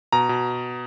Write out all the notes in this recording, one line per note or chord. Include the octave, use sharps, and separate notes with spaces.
B2 A#5
B2